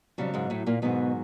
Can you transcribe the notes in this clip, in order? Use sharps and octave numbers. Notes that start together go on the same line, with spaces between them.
F2 C#3 F#3 G3
G#2 G#3
A2 A3
A#2 A#3
G#2 B2 D#3 F#3 B3